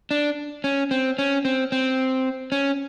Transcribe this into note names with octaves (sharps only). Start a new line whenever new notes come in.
D4
C#4
C4
C#4
C4
C4
C#4